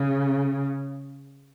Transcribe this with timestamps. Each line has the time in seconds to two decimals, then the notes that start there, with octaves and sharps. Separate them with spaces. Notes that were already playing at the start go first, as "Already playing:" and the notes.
Already playing: C#3